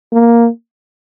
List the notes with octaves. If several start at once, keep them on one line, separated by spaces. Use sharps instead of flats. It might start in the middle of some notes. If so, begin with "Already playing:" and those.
A#3